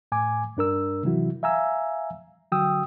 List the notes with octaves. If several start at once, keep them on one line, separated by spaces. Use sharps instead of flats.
A2 G#5 D6
G2 D4 A#4 E6
C3 E3 F#3 E4 F#4
E5 F5 G#5 A#5 E6
D3 F#3 F#4 G5 D#6 E6